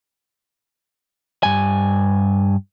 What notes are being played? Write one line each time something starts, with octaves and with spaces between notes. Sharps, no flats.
G2 G#5